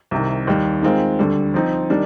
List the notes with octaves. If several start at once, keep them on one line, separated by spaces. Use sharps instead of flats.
C2 C3 D#3
D#2 D#3 G3
D#3 G#3 C4 F4
D2 D3 G3
F3 C4 D#4
D#3 G3 D4